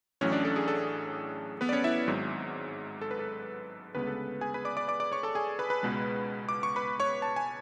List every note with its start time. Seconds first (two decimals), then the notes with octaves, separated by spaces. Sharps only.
0.21 A1 A2 F#3 C#4 C#5
0.32 D4 D5
0.45 A4
0.56 G#4
0.68 A4
1.61 B3 B4
1.69 D5
1.72 C#4 C#5
1.84 E4 E5
2.08 G#1 G#2 F#3
3.02 A4
3.11 B4
3.19 A4
3.95 D2 C#3 G#3 B3 B4
4.07 A4
4.41 G#4 G#5
4.54 B4 B5
4.65 D5 D6
4.77 D5 D6
4.88 D5 D6
5.00 D5 D6
5.12 C#5 C#6
5.23 A4 A5
5.35 G#4 G#5
5.59 B4 B5
5.70 B4 B5
5.83 C#2 B2 G#3
6.49 D6
6.63 C#6
6.76 B4 B5
7.00 C#5 C#6
7.22 A5
7.36 G#5